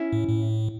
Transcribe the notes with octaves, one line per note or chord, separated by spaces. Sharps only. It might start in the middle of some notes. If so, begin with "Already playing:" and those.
Already playing: C#4 E4
A2
A2